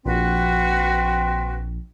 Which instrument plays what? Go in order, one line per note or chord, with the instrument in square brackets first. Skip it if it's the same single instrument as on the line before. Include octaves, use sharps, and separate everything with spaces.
[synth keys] A#1 [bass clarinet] C4 [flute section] F#4 B4